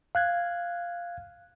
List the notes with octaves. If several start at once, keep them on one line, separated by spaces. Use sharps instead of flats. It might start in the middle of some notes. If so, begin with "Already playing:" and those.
F5 F#6 G#6